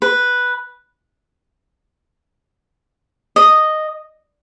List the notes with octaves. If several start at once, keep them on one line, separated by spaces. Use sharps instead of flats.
B4
D#5